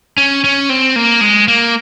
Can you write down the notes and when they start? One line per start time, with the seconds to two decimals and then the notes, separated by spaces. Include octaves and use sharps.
0.18 C#4
0.44 C#4
0.70 C4
0.96 A#3
1.21 G#3
1.48 A#3